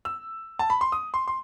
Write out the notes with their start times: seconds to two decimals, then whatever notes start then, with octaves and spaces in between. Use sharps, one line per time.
0.05 E6
0.59 A5
0.70 B5
0.81 C6
0.92 D#6
1.14 C6
1.27 C6